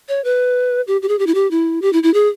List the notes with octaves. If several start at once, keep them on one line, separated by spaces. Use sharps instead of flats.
C#5
B4
G4
G4
G#4
G4
E4
G4
E4
G4
E4
E4
G#4